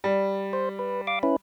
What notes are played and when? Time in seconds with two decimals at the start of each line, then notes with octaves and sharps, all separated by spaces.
0.04 G3
0.53 C5
0.79 B4
1.07 F5 D6
1.23 C#4 E4 B4